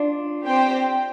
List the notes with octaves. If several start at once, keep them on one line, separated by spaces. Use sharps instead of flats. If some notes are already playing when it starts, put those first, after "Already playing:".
Already playing: D4 F4
C4 G4 C5 G5